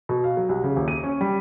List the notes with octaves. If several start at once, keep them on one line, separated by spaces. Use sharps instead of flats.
B2
F5
F#3
C2
C#3
D#1
D#7
C#4
G3